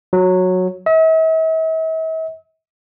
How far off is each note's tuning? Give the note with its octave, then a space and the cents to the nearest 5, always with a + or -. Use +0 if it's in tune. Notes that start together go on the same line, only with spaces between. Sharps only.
F#3 -10
E5 -45